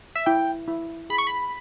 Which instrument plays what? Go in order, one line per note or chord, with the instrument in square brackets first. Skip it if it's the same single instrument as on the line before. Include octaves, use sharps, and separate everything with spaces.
[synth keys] E5
[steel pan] E4 [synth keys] G5
[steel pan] E4
[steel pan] G#4 [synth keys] B5
[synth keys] C#6
B5